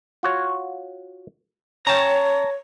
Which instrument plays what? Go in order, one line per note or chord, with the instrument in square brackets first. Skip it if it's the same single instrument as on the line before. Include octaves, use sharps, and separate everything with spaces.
[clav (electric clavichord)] F4 F#4 C#5
[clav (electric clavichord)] C#4 G5 [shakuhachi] C#5 [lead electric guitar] A5 A#5